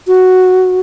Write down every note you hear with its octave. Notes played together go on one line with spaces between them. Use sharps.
F#4